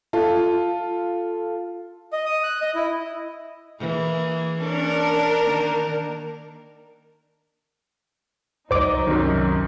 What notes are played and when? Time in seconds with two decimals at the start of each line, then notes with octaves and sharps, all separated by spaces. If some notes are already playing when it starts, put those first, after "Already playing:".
0.13 F4 A4
2.13 D#5
2.26 D#6
2.43 F#6
2.61 D#5
2.75 E4
3.79 E3 A#3 G#4
4.60 C#4 D4 A#4
5.44 D#3 A#3
8.71 C2 F#3 D#4 C5 D5 D#5 D6
9.07 F#2 C3 D#3